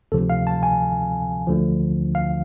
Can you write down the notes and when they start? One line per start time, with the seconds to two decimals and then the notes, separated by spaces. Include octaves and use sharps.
0.12 D2 C3 F3 A4
0.30 F5
0.47 A5
0.63 G#5
1.47 D2 D3 F3
2.15 F5